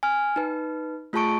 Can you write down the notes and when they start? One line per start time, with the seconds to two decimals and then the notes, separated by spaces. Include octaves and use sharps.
0.03 G#5 F6
0.36 D#4 B4
1.13 A3 F4 G#4 A5 C#6 D7